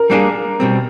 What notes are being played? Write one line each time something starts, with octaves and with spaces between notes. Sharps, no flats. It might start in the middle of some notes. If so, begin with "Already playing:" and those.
Already playing: A#4
G3 A#3 D4 F4 G#4
B2 G3 C4